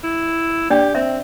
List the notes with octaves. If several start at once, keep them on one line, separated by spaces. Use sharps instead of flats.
E4
D4 G4 D5 G5
C4 E5